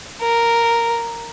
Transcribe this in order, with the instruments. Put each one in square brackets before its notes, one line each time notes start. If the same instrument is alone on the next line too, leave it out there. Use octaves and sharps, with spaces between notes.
[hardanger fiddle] A#4